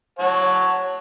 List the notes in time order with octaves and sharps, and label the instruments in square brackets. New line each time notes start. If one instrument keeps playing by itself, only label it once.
[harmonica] C#5 F#5 A5